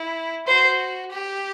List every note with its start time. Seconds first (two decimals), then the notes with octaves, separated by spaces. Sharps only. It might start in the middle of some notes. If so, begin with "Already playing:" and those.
Already playing: E4
0.47 F#4 C5
1.11 G4